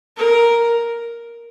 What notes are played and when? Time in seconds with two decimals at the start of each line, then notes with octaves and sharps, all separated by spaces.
0.17 A#4